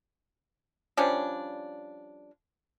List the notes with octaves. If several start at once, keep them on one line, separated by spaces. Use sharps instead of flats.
F3 G3 C#4 D4